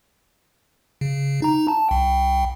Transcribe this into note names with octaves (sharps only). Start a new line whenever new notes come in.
C#3
D#4 A#5
A5
C2 G5